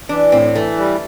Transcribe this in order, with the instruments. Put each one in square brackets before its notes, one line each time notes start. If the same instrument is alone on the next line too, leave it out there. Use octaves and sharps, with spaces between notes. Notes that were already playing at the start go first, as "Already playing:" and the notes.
[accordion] E3 [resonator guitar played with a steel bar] D4
[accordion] A2 [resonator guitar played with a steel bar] C4
[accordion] E3 [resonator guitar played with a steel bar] A3
[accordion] G3